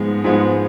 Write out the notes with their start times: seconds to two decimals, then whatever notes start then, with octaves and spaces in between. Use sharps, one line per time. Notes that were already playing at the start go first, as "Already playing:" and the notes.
Already playing: G#2 F3 G#3 B3
0.24 G#2 F3 G#3 B3